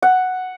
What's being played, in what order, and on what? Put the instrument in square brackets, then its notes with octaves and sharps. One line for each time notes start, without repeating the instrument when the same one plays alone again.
[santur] F#5